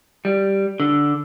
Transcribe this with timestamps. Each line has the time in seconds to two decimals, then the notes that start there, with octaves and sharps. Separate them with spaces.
0.25 G3
0.80 D3